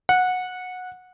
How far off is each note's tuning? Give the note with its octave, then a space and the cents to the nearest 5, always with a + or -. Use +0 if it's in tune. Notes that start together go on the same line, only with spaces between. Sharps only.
F#5 -15